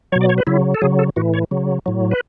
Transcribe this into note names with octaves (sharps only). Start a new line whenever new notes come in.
B2 F#3 C#5
D5
C#5
B4
C#3 F#3 E4
A4
C#3 F#3 G#4
A4
A2 E3 F#4
C#5
C#3 F#3
A2 F#3
B4